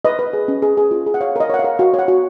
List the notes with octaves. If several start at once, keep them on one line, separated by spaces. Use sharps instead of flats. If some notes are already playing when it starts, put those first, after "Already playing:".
B4 D#5
B4
G#4
C#4
G#4
G#4
F4
G#4
F#5
C#5 F5
A#4 D#5
C#5 F#5
F5
A#4
F#4 F5
C#5
F#5
F#4